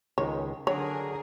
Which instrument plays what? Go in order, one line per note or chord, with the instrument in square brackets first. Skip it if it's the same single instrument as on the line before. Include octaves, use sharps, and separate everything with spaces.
[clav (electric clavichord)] C#2 D#3 G#3 [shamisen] C#5
[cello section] D3 G#4 A#4 [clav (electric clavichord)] F#3 D4 [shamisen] C#5